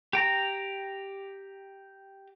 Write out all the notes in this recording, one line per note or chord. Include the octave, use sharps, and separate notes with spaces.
G4 G5 A#5